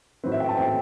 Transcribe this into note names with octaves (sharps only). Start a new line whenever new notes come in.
A2 F#3 C4 B4
E5
G5
A5
A2 F#3 C4 G5